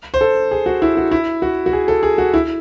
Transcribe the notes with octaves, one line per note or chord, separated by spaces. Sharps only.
C5
A4
G#4
F#4
E4
F#4
E4
F#4
F#4
G#4
A4
G#4
F#4
E4